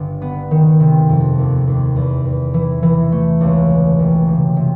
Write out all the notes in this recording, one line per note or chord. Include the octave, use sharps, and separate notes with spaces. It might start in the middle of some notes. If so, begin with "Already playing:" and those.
Already playing: G1 G3
B3
D#3
C3
F2
D#2
D#2
E2
E2
E3
E3
A3
C#2
B2
F#1
C3
C3